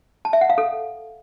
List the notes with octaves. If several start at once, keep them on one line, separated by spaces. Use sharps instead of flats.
A5
E5
F#5
F5
A4